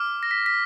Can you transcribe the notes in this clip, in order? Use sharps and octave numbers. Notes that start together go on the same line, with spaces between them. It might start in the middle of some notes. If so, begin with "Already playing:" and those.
Already playing: D6 F6
A#6
B6
B6